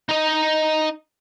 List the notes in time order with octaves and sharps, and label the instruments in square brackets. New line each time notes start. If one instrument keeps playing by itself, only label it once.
[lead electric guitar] D#4 D#5